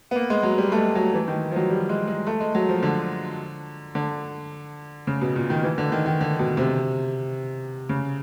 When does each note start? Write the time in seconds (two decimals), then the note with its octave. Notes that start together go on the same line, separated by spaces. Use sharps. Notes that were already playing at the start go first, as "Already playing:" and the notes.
0.11 B3
0.16 A#3
0.30 G#3
0.43 F#3
0.58 G3
0.72 A3
0.76 G#3
0.95 F#3
1.14 E3
1.28 D#3
1.51 F3
1.56 F#3
1.70 G3
1.89 G#3
2.07 G#3
2.27 A3
2.40 G#3
2.55 F#3
2.69 F3
2.83 D3
3.95 D3
5.07 C#3
5.21 B2
5.36 A#2
5.50 D#3
5.63 E3
5.78 D3
5.92 D#3
6.06 D#3
6.21 D3
6.39 B2
6.57 C3
7.89 C#3